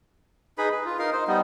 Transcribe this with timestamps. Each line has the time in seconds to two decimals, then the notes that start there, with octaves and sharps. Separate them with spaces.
0.58 D#4 G#4 B4 B5
0.72 B4
0.85 F4
0.99 D#4 A#4 F5
1.13 D#4 C5
1.27 G3 B3 D#4